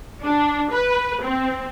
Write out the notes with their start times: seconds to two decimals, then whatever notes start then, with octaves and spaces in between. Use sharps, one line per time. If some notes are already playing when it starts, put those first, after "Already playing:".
0.22 D4
0.72 B4
1.22 C4